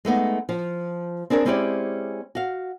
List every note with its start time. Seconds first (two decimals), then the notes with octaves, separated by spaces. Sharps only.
0.05 G#3 A3 B3 D#4
0.49 F3
1.30 C4 D4 G#4 A#4 C#5
1.45 G#3 C4 C#4 E4 G4 D5
2.35 F#4 F5